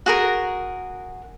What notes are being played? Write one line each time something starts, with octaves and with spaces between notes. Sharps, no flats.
F#4 G#4 A#4